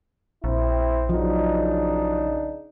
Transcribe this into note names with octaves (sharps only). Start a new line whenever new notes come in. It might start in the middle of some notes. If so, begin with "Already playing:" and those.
A#1 C4 E4
C#3 F3 F#3 D4 D#4